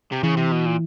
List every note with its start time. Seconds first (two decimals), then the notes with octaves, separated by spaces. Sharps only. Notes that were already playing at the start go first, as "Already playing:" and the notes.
0.12 C3
0.23 C#3 E3
0.37 C3
0.52 B2
0.66 A#2